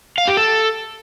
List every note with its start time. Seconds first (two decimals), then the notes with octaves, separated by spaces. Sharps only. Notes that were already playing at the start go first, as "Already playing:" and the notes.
0.18 F5
0.28 G4
0.37 A4